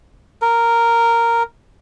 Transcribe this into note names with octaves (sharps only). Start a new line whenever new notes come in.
A#4